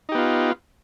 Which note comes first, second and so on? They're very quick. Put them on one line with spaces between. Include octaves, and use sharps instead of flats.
D#4 G4 B3 F4